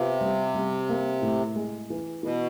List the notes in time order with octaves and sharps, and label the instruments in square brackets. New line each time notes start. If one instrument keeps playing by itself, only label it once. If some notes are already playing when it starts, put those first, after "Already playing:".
Already playing: [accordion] C3 [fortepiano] B3 F4
[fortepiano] G3
G3
A#3
A2
G#3
E3
[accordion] B2 [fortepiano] E3